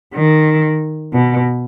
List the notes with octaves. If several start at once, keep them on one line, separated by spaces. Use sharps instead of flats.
D#3
B2